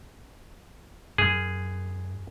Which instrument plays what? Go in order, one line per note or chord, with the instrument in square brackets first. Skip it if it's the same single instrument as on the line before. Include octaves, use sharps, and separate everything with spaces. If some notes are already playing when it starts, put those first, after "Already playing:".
[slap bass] F#2 [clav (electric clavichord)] G#4